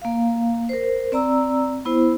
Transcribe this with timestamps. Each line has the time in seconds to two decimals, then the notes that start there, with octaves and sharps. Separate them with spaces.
0.02 A#3 F5
0.69 A#4 C5
1.12 C4 D5 A#5 E6
1.85 B3 E4 C5